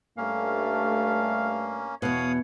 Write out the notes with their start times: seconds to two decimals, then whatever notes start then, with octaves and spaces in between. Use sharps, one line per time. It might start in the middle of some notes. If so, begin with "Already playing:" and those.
0.18 G2 A3 A#3 C#4 F5
2.02 E2 B2 C#5 F5 F#5 D#6